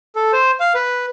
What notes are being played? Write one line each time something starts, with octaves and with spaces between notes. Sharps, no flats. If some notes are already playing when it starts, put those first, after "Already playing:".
A4
C5
F5
B4